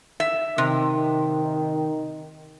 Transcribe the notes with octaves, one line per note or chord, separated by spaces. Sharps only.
E5
C3 D#3